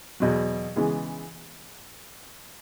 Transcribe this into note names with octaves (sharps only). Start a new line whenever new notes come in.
E2 B2 F#3
C#3 E3 G#3 B3